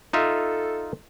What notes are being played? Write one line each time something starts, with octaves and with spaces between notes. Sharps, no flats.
D#4 F4 A4 E5